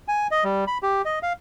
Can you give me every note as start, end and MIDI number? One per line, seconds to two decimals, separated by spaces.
0.08 0.27 80
0.31 0.44 75
0.44 0.65 55
0.67 0.78 83
0.83 1.02 67
1.05 1.19 75
1.23 1.33 77